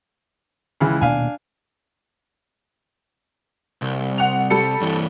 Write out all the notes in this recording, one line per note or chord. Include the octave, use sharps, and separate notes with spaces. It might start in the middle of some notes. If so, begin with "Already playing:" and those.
C#2 E3 G#3
D#1 B2 A#3 D4 F5 G#5
C2
F#5 F7
G3 A4 C#7
G2 E3